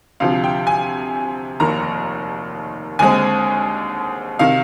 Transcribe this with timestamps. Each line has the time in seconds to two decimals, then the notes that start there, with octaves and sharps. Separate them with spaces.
0.20 D2 C3 F3 F5
0.44 G5
0.67 G#5
1.60 F1 D#2 D#3 A#3 A#5
2.99 D#2 D3 G#3 C4 G#5
4.39 C3 D#3 F5